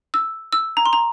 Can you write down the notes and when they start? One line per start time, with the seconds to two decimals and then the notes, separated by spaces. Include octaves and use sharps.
0.14 E6
0.53 E6
0.77 A#5
0.86 C6
0.93 A#5